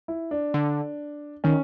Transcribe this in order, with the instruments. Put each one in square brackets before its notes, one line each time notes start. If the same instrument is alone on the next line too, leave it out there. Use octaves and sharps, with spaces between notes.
[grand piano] E4
D4
[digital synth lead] D3
[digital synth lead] D#3 [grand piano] C#4